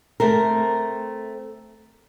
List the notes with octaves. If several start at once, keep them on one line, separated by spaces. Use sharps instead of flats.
A3 C4 A#4